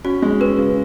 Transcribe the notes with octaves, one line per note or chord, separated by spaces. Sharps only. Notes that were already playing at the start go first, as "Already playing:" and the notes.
C#4 F#4
G#3
C#4 B4
C#3